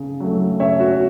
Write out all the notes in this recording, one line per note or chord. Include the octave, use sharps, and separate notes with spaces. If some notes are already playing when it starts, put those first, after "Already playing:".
Already playing: C#3
F#3 A3
C#3 C#5 E5
F#4